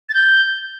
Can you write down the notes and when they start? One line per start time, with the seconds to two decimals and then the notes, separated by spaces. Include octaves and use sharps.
0.09 A6
0.14 G6